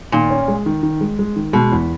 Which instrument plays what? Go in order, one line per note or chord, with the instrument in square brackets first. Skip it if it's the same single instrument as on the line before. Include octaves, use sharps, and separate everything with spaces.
[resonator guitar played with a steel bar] A#2 [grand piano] D#3
[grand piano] C#4
G#3
D#3
D#3
G#3
G#3
D#3
[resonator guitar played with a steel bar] B2 [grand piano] G#3
[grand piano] E2